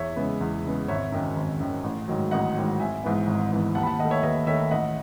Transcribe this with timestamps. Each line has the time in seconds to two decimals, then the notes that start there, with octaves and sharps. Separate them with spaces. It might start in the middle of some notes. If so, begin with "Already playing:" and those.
Already playing: E2 C#5 E5
0.16 C#3 G#3 B3
0.41 E2
0.64 C#3 G#3 B3
0.88 G#1 C#5 E5
1.12 F#2 D#3
1.36 G#1
1.60 F#2 D#3
1.84 A1
2.08 G#2 D#3 F#3
2.31 A1 D#5 F#5
2.55 G#2 D#3 F#3
2.80 G#1 E5 G#5
3.04 G#2 E3 B3
3.27 G#1
3.52 G#2 E3 B3
3.75 D#2 F#5 A5
3.83 B5
3.87 F#5 A5
3.99 D#3 D#5 F#5
4.04 A3
4.11 C#5 E5
4.23 D#2 B4 D#5
4.47 D#3 A3 C#5 E5
4.71 A1 D#5 F#5